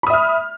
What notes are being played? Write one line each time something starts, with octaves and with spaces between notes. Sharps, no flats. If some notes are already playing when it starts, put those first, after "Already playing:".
E5 B5 D#6 F6